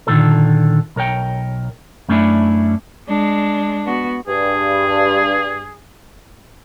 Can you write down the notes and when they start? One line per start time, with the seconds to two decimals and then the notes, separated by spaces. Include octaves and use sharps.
0.07 A#2 D3 D#3 G#3 F4 A4
0.96 B1 A#4 C#5 G5
2.09 F#2 A3 C#4 D4 E4
3.09 G#3 D4
3.86 B3 F#4
4.28 G2 G#4